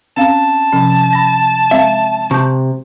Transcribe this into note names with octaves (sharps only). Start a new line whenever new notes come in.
C4 C#4 F5 A5
C3 F3 C#4
B5 A#6
G#3 C4 E5 F5
C3 C#6 G6